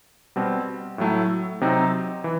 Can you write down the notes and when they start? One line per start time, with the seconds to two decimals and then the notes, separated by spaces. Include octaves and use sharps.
0.36 B2 G3 C4
0.98 A2 F#3 A3 E4
1.61 C3 F#3 C4 D#4
2.24 E3